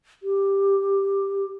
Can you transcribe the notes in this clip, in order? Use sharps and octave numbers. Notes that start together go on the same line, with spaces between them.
G4